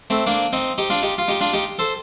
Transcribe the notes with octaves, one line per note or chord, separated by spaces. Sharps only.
A3 C4
A#3 D4
C4 D#4
D#4 G4
D4 F4
D#4 G4
F4
D#4 G4
D4 F4
D#4 G4
A4 C5